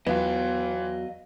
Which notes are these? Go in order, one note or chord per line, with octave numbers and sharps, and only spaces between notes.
E2 E3 F#3 B3 F4 D#5 F5